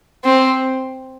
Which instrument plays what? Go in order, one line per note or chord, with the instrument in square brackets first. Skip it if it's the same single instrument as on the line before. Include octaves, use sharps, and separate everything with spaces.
[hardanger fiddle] C4